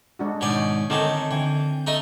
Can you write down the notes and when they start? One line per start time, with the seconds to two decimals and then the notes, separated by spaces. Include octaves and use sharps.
0.19 G#3 D4 F#4
0.41 G#2 B2 D#3 C#4 D5
0.90 D3 D#3 A3 C4 C#4 D#4 A4
1.31 D3 E3 G5
1.87 A3 D#4 D#5